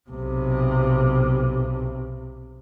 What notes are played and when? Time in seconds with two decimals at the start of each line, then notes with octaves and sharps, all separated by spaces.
0.10 B1 C3